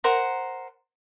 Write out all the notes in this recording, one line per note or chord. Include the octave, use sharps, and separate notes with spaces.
A#4 C5 F#5 A#5